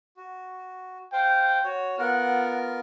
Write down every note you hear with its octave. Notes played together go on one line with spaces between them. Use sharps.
F#4
C5 F5 G5
F#4 C#5
B3 F4 A#4 F#5